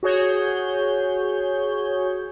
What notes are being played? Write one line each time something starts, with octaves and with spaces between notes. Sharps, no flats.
F#4 G#4 C#5 G6